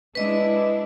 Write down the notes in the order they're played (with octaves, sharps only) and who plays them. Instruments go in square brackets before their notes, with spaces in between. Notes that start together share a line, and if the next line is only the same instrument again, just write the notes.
[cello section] G#3 D4 E4 [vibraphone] B4 D#5